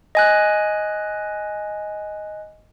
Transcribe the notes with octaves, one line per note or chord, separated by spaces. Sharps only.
D#5 G#5 F#6